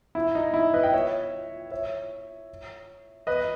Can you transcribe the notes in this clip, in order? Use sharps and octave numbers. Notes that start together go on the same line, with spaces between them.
E4
D#4
E4
B4 D#5
G5
C#5 E5
C#5 E5
B4 D#5